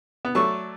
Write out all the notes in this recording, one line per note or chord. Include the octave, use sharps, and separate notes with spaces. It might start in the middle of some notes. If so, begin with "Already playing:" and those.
B3
F#3 A3 D5 A5 C#6